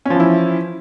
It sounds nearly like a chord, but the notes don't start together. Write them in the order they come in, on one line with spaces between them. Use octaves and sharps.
C#4 F3 E3 E4